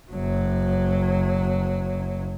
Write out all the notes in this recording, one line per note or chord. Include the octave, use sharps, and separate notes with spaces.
F#1 F#3